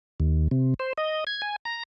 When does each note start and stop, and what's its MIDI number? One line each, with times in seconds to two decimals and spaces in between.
0.20 0.48 39
0.51 0.74 48
0.80 0.93 72
0.98 1.24 75
1.27 1.41 92
1.42 1.56 80
1.65 1.83 82